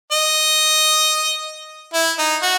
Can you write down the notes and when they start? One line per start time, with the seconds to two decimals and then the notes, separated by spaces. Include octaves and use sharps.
0.12 D#5
1.94 E4
2.19 D#4
2.42 F#4